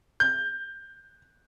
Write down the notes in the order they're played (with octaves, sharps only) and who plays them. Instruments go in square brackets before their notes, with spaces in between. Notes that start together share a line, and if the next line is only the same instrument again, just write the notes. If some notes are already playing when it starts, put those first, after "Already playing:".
[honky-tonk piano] G6